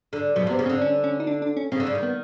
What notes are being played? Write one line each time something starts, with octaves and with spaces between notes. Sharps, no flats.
D3
B2 F#3
C3
B3
C#3
D3 C4
C#4
C#4
D#4
D4
D4
C#4
C#3 C4
D3
C#3
D#3
B3